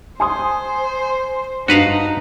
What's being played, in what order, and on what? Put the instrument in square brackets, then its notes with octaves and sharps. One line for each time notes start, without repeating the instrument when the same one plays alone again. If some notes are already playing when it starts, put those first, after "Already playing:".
[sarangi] C5 [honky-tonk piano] G#5 C6 D#6
[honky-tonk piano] G2 [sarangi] D#4 [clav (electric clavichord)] F#4 B4 F5